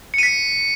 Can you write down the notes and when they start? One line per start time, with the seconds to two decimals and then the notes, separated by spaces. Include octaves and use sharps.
0.14 C#7
0.18 D#7
0.23 B6